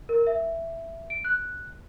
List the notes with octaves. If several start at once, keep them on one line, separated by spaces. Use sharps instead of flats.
A#4
E5
D7
F#6